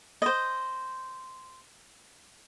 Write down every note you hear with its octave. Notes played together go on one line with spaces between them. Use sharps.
C5 D#5